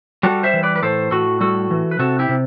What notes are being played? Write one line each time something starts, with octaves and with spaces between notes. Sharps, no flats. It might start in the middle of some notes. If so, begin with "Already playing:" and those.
G3 F#4 A4
C5 E5
E3
B4 D5
B4
A2 A4 C5
A2 F#4 A4
G3 F#4 A4
E3
B4
C3 F#4 A4
E4 G4
C3